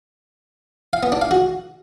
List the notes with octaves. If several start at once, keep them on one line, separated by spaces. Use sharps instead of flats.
F5
B3
D4
F5
F#4